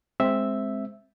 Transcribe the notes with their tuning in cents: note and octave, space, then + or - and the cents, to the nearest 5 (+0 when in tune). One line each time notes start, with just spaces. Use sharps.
G#3 +0 C4 +0 E5 +0